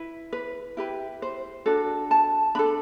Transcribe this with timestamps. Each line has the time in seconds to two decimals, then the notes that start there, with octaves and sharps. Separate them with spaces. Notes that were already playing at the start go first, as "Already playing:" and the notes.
Already playing: E4 B4
0.33 B4
0.77 E4 G4 B4
1.22 C5
1.66 D4 F#4 A4
2.11 A5
2.55 D4 A4 B5